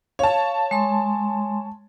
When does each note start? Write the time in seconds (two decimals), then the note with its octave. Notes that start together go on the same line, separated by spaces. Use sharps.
0.19 C#5 F5 A5
0.71 G#3 C6